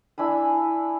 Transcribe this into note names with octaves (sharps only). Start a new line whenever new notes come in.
D4 E4 G#5 B5